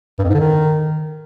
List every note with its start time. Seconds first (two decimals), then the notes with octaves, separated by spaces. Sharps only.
0.19 G2
0.24 F2
0.29 G#2
0.34 D3
0.39 D#3